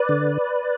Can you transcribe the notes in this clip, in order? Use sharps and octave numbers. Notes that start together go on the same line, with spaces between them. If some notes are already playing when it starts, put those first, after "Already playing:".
Already playing: B4 D5
D3